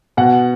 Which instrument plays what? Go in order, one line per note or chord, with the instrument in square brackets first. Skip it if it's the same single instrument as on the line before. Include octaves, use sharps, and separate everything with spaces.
[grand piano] B2 F#5